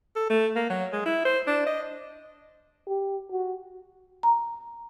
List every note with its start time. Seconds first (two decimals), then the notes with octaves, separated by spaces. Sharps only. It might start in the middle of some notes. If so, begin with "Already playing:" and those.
0.16 A4
0.30 A3
0.56 A#3
0.70 F#3
0.93 G#3
1.06 E4
1.25 C5
1.47 D4
1.66 D#5
2.88 G4
3.31 F#4
4.23 A#5